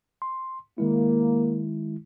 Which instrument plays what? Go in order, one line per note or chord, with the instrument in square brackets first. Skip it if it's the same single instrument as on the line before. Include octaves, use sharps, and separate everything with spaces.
[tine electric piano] C6
[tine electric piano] D#3 G#3 E4 [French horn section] A#3